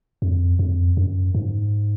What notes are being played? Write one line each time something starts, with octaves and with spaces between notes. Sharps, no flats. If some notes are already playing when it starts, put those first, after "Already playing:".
F2
F2
F#2
G#2